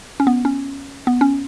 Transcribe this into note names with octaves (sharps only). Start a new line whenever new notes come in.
C#4
B3
C#4
B3
C#4